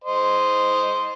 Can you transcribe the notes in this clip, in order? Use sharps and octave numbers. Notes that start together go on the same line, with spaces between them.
C5 D#5